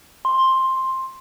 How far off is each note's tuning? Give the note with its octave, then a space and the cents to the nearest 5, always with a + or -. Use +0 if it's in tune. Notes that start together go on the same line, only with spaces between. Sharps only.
C6 +10